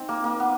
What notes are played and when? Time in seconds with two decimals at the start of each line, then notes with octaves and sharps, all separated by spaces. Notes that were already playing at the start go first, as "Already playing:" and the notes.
Already playing: C4 D#4
0.09 A#3
0.24 A#3
0.40 B3